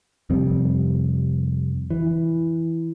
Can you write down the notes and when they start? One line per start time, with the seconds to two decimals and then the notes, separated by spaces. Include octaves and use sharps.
0.30 F2 C3 G3
1.90 E3